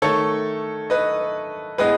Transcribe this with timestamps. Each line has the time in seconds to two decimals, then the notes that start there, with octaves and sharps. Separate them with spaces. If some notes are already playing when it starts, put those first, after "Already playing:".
0.02 D#3 A3 A4 C#5
0.90 B4 D#5
1.78 A2 G#3 B3 B4 D#5